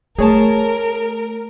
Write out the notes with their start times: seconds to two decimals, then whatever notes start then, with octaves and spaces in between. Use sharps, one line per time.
0.19 A3 G#4 A#4 C#5 A5